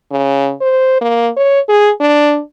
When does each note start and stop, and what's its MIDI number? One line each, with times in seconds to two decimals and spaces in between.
0.11 0.53 49
0.61 0.98 72
1.01 1.29 58
1.36 1.60 73
1.69 1.91 68
2.00 2.40 62